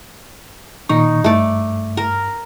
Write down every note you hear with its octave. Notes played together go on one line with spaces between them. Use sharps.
A#2 D#3 D#4 C#6
G2 A3 D5
A#4